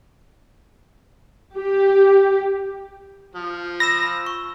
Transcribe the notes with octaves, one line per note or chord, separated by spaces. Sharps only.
G4
F3
B5 E6 A#6 E7
B5
C#6